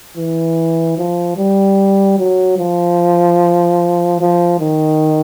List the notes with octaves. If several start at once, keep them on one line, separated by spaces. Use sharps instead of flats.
E3
F3
G3
F#3
F3
F3
D#3